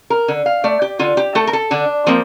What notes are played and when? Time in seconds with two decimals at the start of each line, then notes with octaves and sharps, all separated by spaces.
0.10 A#4
0.28 D3
0.46 F5
0.64 A3 D5
0.82 G4
0.99 D3 F4
1.17 G4
1.35 A3 A4
1.47 A#4
1.53 A4
1.71 D3 D4
2.06 F3 A#3 C4